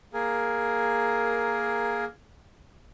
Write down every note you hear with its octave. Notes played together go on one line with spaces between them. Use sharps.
A#3 G#4 A#4